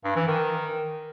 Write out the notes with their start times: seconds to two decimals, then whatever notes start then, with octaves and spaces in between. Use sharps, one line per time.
0.04 G2
0.16 E3
0.27 D#3